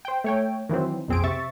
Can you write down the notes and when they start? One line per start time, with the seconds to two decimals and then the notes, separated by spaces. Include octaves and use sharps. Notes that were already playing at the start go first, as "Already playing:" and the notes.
0.05 C5 G5
0.24 A3 C#5 G5
0.69 D#3 E3 F#3 C4
1.08 B1 F2 C4 G#4 D7
1.24 C3 E5 C#6 A6